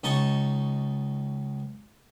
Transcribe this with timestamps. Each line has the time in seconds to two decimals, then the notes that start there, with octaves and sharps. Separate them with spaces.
0.04 C#2 D#4 D#5 A5 C#6